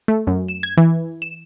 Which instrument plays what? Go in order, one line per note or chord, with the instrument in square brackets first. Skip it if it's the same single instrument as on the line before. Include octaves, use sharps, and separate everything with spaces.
[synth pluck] A3
F#2
E7
G#6
E3
E7